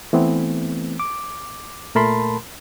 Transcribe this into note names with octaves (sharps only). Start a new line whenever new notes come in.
E3 A3 B3 C4
D6
A#2 A3 A#4 A5 B5 C6